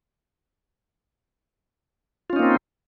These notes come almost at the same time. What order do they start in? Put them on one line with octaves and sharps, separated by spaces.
F4 C#4 D#4 A#3 C4